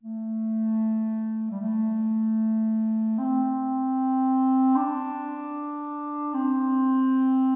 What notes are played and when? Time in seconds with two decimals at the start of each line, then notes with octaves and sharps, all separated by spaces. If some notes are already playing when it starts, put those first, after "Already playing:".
0.03 A3
1.50 G3
1.60 A3
3.18 C4
4.76 D4
6.34 C4